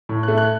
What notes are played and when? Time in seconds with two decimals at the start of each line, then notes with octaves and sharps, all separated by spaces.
0.09 A2
0.23 A3 F#6
0.38 F#6